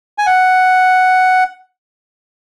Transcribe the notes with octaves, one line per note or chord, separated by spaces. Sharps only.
G#5
F#5